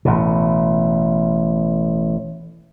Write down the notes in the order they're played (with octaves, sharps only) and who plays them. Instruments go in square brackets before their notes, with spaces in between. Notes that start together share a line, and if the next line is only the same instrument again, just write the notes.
[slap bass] A1 B2